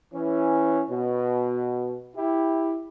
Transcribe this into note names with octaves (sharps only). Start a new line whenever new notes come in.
E3 C#4
B2
E4 G4